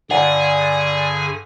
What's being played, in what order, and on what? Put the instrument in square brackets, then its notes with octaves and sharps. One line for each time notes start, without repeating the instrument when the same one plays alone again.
[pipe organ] G2 D3 G#5 [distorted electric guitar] G#4 [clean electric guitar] D5 F5 A#5 [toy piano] F#5